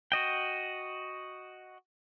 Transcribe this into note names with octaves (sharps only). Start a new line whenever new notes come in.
F#4 D#5 G5